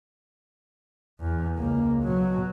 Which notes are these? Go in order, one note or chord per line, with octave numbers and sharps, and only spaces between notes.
E2
C#2 A#3
B2 F#3